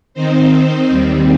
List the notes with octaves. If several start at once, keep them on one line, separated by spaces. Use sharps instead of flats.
D#3 C4 D#4 C5
D#2 D#3 G3 C4